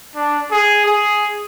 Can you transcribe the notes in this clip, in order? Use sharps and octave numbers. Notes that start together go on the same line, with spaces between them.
D4
G#4
G#4